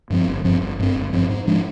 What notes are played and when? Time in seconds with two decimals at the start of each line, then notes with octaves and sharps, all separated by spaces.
0.10 G2 F3 C4
0.28 G1
0.44 G2 F3 C4
0.61 G1
0.80 G2 F3
0.83 C4
0.96 G1
1.13 G2 F3 C4
1.29 G#2
1.47 F3 G#3 D4